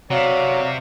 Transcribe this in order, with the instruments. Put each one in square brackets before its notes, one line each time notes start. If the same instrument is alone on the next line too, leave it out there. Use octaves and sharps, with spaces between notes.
[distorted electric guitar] C3 [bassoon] F#3 [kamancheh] D5 F5